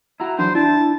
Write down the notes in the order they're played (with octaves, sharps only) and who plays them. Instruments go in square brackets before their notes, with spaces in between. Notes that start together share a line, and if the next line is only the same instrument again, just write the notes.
[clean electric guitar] E4 F#4 [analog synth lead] A#5
[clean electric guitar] D3 E3 F#3 [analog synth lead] D4 [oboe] C5
[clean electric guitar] D4 [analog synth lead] E4 [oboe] A5